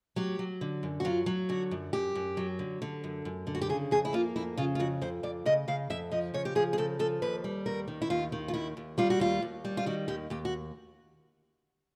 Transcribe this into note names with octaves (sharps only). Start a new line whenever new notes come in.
F#3 G4
F#3
D3
F#2
F#4
F#3 F4
F#3
D3 F#4
F#2
F#2 G4
F#2
F#3
D3
D3
F#2
F#2
D3
F#4
G4
C#3 G#4
F2 G#4
E4
A#3 F4
F2 E4
C#3 F4
F4
F2 F#4
F2 C5
F2 D5
C#3 D#5
C#3 F5
F2 E5
F3 D#5
C#3 C#5
G4
F3 G#4
G#4
C#3 A4
F3 A4
D#2 B4
G3
D#2 A#4
D#3
E4
D#2 F4
D#3
F4
D#2 E4
D#2
G3 F4
F#4
D#2 F4
D#2
G3
F4
D#3 F#4
D#2 G4
D#2 G4
F#4